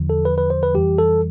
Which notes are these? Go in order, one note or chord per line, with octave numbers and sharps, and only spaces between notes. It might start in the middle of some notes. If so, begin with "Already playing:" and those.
Already playing: E2 D3 F3
A4
B4
B4
C5
B4
F2 E3 G3 G4
A4